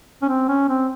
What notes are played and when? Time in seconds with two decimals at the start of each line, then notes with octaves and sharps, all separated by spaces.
0.23 C#4
0.29 C4
0.49 C#4
0.69 C4